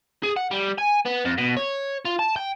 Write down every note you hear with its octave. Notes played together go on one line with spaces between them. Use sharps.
G#4
F#5
G3
G#5
B3
F2
B2
C#5
F4
A5
G5